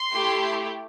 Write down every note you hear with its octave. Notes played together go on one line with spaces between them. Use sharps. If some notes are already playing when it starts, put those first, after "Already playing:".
Already playing: C6
A3 E4 G4